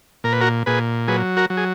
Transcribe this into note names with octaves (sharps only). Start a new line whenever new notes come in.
A#2 A#4
B4
F#4 A#4
A#2 G#4 B4
F#3 G#4 B4
F#4 A#4
F#3
G#4